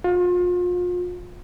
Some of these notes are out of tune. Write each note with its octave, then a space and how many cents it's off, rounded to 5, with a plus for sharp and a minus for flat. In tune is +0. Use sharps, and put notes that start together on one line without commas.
F4 +35